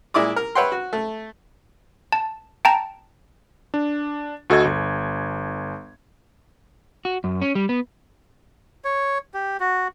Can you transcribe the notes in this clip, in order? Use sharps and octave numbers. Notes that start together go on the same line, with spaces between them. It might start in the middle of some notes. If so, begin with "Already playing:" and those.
A#2 G#3 E4 D5 D6 D#6
A#4
B4 C#5 E5 F#5 G5 C6
F#4
A3
A5
G5 A5 A#5
D4
D2 F#4 A4 D#5 G#6
G1
F#4
F#2
C#4
G3
B3
C#5
G4
F#4